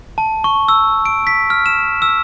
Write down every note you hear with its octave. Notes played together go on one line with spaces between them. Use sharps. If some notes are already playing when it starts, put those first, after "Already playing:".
A5
C#6
E6
D7
B6
F6
E7
E6